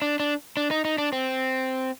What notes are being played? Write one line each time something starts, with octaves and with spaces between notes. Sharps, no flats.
D4
D4
D4
D#4
D#4
D4
C4